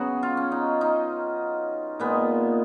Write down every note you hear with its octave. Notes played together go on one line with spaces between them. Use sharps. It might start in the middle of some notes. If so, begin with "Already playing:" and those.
Already playing: C#3 F#3 B3 F#4 G#4
F4
C#4
D#4
D#4
A#2 G#3 B3